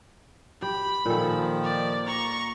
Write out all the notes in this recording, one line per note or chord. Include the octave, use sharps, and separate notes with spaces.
G4 B5
A#2 D#3 F3 A4
D5
A#5 C#6